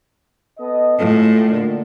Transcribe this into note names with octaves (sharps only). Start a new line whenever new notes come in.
B3 A4 D#5
A2 G#3 F4 A4
A#2 D3